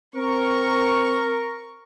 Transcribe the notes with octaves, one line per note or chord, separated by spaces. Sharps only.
C4 A#4 C#6